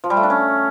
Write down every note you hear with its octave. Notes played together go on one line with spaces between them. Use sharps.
F3
G3
A3
D4
C#4